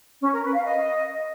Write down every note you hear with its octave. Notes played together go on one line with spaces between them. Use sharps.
C#4
A#4
B4
F5
D#5